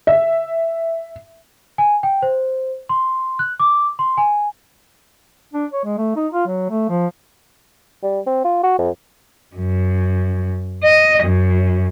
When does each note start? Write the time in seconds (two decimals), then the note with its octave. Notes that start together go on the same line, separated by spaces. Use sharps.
0.07 E5
1.78 G#5
2.03 G5
2.22 C5
2.89 C6
3.39 F#6
3.60 D6
3.99 C6
4.17 G#5
5.54 D4
5.73 C#5
5.84 G#3
5.98 A3
6.16 D#4
6.33 F4
6.47 F#3
6.70 A3
6.89 F3
8.03 G3
8.27 C4
8.45 F4
8.63 F#4
8.79 F2
9.55 F#2
10.84 D#5
11.23 F#2